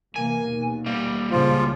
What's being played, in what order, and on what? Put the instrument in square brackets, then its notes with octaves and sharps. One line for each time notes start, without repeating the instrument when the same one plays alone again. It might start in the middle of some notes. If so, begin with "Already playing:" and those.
[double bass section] C3 E3 A#3 [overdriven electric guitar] G#5
[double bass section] D#2 B2
[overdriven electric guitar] G3 A#3
[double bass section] C#2 A#2 C#3 [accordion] F3 F4